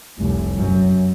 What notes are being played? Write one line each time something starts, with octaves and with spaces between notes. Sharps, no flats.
F1 C2
F#2